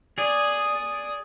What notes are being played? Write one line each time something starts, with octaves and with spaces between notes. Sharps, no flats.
G#4 D5 D#6